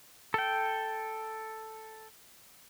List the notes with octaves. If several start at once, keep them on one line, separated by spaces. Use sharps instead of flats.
A4 G5